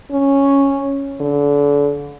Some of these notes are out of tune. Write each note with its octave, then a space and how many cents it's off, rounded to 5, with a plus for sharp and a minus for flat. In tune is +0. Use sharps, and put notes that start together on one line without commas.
C#4 -5
D3 -35